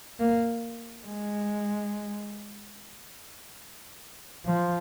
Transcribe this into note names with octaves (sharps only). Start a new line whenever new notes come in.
A#3
G#3
F3